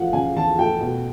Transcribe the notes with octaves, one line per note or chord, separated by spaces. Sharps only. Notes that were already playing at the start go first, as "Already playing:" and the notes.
Already playing: E2 F3 A3 F5 F#5
C#3 G#5
E2 A5
A3 G5
B2